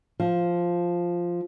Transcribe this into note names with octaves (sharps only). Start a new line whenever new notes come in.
F3